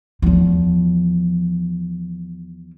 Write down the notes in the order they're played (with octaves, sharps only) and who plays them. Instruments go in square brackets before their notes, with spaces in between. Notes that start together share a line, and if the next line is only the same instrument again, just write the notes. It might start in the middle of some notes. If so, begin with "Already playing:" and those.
[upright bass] E2 F3